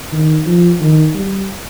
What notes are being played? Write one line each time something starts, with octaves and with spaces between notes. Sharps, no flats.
D#3
F3
D#3
G3